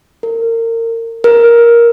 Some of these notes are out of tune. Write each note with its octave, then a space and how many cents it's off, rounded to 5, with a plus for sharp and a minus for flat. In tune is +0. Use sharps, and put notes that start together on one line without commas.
A#4 -30
A#4 +10